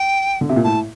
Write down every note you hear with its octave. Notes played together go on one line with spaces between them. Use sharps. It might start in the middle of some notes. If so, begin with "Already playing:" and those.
Already playing: G5
D3
C3
A#2
A2 A5